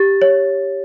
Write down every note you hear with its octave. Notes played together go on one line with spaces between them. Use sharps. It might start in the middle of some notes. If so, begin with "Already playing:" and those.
Already playing: G4 A6
C#5